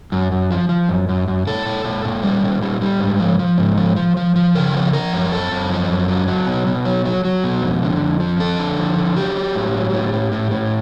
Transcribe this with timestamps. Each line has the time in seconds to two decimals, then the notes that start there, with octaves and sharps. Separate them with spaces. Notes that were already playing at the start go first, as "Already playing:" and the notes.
0.12 F#2
0.32 F#2
0.51 F3
0.69 F3
0.89 F#2
1.09 F#2
1.28 F#2
1.47 A#2 A4
1.66 A#2
1.85 A#2
2.05 A#2
2.23 G3
2.43 A#2
2.62 G3
2.81 G3
3.00 G#2
3.20 F3
3.39 F3
3.58 G#2
3.77 F3
3.96 F3
4.17 F3
4.36 F3
4.55 C#3 A#4
4.74 F3
4.93 F3 A#4
5.13 F#2
5.32 F#2 A4
5.52 F#2
5.70 F3
5.90 F#2
6.08 F#3
6.28 F#3
6.47 B2
6.67 B2
6.85 F#3
7.05 F#3
7.25 F#3
7.44 B2
7.62 F2
7.83 D3
8.01 F2
8.20 F3
8.40 F2 A4
8.59 D3
8.78 F3
8.98 D3
9.16 F#3 G4
9.36 F#3
9.55 A2
9.75 F#3
9.93 A2
10.13 A2
10.32 A2
10.51 A2